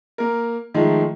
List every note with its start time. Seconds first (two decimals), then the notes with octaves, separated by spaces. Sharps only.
0.18 A#3 A#4
0.74 D#3 F3 G#3 A3